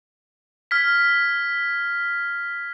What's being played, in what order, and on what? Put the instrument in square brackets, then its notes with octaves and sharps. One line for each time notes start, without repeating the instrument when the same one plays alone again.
[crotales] F6 G#6 B6